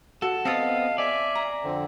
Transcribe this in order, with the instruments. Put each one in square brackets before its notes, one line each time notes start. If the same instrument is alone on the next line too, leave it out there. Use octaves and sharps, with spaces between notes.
[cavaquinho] F#4 [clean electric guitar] A4
[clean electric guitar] B3 C4 [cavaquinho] A4 D#5 A5 [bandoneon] F5
[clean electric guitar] D5 [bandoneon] E5 G#5
[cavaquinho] A#5
[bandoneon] F2 D3 C4